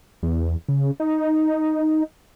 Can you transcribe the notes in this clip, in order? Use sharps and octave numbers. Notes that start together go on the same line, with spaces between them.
E2
C#3
D#4